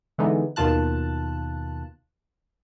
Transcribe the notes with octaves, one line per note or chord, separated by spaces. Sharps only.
D3 E3 G#3 B3 D#4
D#2 B2 D#3 F4 A5 F#6